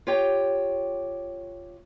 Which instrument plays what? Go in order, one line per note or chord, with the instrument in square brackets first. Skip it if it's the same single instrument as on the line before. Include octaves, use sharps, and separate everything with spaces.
[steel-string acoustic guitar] F4 G4 C#5 G5